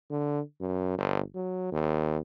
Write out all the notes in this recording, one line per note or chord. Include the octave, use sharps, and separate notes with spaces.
D3
F#2
G1
F#3
D#2